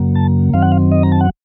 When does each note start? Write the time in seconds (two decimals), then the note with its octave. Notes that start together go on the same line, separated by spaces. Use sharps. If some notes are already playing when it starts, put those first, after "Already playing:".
Already playing: F#2 C#3 F#3 A#3
0.16 A5
0.53 F#2 D#3 F#3 C4 F5
0.62 F#5
0.72 F5
0.92 D#5
1.03 A#5
1.12 A5
1.21 F#5